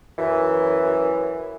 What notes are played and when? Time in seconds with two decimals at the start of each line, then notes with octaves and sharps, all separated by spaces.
0.19 F#2 E3